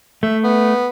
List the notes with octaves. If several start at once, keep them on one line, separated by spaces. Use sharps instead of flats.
A3 E5
B3